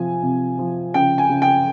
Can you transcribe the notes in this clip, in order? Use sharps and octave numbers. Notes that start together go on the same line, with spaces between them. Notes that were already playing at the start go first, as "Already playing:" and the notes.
Already playing: C3 F3 G#5
C3
F3
C#3 G5
G#5
C#3
G5